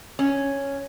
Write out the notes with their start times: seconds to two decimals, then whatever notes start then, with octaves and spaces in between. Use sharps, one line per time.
0.19 C#4